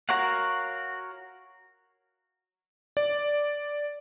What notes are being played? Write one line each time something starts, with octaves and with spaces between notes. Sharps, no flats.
F#4 A#4 C#5 F5 F#5
D5